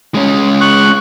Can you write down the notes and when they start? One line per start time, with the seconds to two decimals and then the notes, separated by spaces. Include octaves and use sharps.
0.15 G#3 C#4
0.61 C#6 F#6